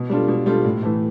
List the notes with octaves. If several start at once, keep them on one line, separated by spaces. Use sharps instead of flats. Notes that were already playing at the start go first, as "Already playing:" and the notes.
Already playing: B2
G3 D4 F4 A4
B2
G3 D4 F4 A4
A2
E3 A3